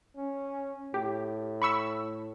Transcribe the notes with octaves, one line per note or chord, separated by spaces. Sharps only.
C#4
A2 G4
B5 C#6 E6